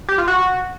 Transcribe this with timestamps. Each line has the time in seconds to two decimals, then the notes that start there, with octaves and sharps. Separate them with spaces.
0.09 G4
0.18 F4
0.28 F#4